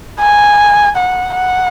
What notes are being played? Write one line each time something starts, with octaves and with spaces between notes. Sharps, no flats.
G#5
F#5
F#5